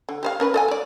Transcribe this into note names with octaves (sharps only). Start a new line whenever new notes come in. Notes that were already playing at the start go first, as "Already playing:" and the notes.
D3
G4 C5 F5
C#4 A#4 B4
A4 D#5 G#5
A3 D5